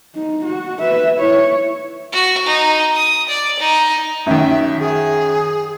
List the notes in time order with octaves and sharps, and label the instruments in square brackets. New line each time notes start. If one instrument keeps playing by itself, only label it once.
[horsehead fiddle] D#4
F#4
B4 E5
E4 C#5
[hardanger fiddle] F#4
D#4
D#6
D5
D#4
[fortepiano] F#2 D#3 [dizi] E5
[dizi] G#4